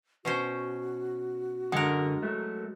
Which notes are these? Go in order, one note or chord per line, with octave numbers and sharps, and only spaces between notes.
B2 C#4 F#4 C5
F#2 D3 G#3 A#4 F#5
F#3 A3